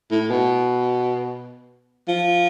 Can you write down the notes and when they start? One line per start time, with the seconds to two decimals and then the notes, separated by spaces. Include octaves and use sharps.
0.11 A2
0.30 B2
2.08 F3